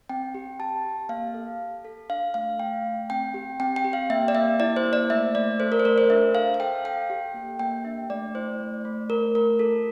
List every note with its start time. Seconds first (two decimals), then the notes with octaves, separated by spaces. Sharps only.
0.09 C4 G5
0.35 G4
0.59 G4 A5
0.85 G4
1.09 A#3 F5
1.34 A4
1.60 A4
1.85 A4
2.10 D4 F5
2.34 A3 F5
2.59 A3 G5
2.85 A3
3.10 C4 G5
3.34 G4
3.60 C4 G5
3.76 G5
3.84 G4
3.93 F5
4.10 A#3 E5
4.28 D5
4.35 A#3 E5
4.60 E4 D5
4.76 C5
4.85 A#3
4.93 D5
5.10 A3 E5
5.35 A3 D5
5.60 A4 C5
5.72 A#4
5.80 C5
5.85 A3 A#4
5.98 C5
6.10 D4 E5
6.35 A4 F5
6.54 F5
6.60 A4 G5
6.85 A4 G5
7.10 G4
7.34 A#3
7.59 A#3 G5
7.85 D4 E5
8.10 A3 D5
8.35 E4 C5
8.60 A3
8.85 A3
9.10 A3 A#4
9.35 A3 A#4
9.59 F4 A4